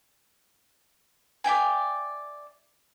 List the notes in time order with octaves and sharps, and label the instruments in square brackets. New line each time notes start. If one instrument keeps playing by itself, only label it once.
[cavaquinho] D5 E5 G5 G#5